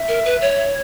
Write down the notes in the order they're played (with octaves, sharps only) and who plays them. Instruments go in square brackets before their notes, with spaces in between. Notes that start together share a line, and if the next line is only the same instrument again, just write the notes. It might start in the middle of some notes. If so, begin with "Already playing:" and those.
Already playing: [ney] E5
[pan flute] A#4
B4
C#5